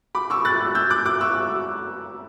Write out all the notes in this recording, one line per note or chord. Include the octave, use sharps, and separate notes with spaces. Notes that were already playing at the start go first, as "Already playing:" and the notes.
B5 D6
C#6 E6
F#6 A6
E6 G6
D6 F#6
D6 F#6
C#6 E6